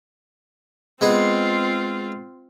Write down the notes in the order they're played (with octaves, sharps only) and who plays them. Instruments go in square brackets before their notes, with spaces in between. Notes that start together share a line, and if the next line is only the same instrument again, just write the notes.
[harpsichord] G#3 B3 G#4 [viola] C4 F4